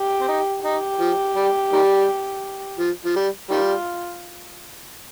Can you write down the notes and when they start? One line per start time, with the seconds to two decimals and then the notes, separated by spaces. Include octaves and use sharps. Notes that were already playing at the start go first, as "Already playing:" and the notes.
Already playing: G4
0.21 C4
0.28 D#4
0.65 D#4 G4
1.00 F3
1.36 G3
1.73 D#3 G3
2.79 F3
3.05 F3
3.16 G3
3.51 D#3 G3 F4